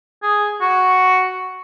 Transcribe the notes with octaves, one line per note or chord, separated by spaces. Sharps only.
G#4
F#4